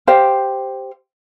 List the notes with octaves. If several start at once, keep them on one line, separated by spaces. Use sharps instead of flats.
G4 C5 F5